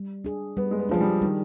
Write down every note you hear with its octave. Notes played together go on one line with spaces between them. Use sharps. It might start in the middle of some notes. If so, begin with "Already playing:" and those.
Already playing: G3
D4 G#4
G3 B3
G#3
B3
F3 D4 G#4
G3
D#3 G3